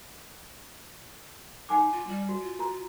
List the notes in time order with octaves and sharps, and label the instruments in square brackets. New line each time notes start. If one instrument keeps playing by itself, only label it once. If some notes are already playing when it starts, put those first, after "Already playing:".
[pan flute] D#4 [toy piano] F#5 G#5 D6
[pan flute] F4
G3
[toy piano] F#4
[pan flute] F4
[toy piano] F#4 A#5